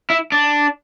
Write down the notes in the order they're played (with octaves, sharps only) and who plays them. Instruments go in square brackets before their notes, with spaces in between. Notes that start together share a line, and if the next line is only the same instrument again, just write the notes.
[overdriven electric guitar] E4
D4